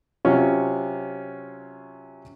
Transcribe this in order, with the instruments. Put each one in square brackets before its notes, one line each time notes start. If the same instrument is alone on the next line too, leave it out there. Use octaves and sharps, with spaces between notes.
[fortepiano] C3 F#3 C#4 F4